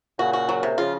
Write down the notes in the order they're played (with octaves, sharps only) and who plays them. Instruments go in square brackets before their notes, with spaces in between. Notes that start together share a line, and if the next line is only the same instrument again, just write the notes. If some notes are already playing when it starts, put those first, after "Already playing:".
[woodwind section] A#2 C#3 [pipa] F#4
[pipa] F#4
F#3
C3
[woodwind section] C#3 F3 [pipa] F4